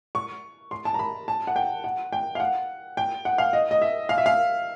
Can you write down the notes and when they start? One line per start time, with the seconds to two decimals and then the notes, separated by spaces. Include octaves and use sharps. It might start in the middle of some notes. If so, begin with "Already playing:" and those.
0.15 C#6
0.71 C6
0.85 A5
0.94 A#5
0.99 B5
1.28 A5
1.47 F#5
1.56 G5
1.84 F#5
2.12 G5
2.35 F5
2.40 F#5
2.97 G5
3.25 F#5
3.38 F5
3.53 D#5
3.71 D#5
3.82 E5
4.09 F5
4.18 E5
4.26 F5